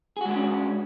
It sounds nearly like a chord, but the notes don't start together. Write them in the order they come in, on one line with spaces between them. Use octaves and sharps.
G#4 F#4 G#3 D4 C#4